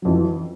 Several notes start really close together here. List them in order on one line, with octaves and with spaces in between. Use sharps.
F#3 F2 E3